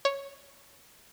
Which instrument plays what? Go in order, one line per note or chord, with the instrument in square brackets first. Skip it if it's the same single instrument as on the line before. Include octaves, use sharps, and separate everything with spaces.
[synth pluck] C#5